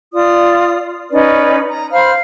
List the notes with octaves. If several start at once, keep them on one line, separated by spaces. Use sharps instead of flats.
F4 D5 D#6
C#4 D#4 B4 D5
A#5
C5 F5 B5 F6